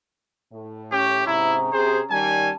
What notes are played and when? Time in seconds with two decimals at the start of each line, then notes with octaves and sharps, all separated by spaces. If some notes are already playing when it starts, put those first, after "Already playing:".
0.53 A2
0.92 C#4 G4
1.27 G#2 C3 E4 A#5 D#6
1.73 C3 G#4 C5
2.11 D#3 G3 G#5 A5